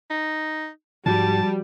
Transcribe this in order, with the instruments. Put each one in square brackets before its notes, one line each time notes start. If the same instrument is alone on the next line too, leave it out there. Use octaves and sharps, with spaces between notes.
[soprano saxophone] D#4
[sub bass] G#2 [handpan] F3 F#4 [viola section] G3 [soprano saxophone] A5